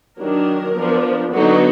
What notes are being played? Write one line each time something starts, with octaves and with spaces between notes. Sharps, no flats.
D#3 F#3 D4 A#4
F3 B3 D4
D3 F#3 B3 D#4 F#4